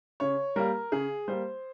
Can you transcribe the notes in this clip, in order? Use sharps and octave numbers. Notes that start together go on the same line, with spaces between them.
C#3 C#5
G3 A#3 A#4
C#3 G#4
G3 A#3 C5